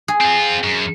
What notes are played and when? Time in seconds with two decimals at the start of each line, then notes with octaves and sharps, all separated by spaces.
0.08 G#4
0.21 C4 F4
0.64 F#2